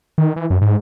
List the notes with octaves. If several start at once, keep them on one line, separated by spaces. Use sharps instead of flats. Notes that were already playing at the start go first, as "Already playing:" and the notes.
D#3
E3
F#2
G#2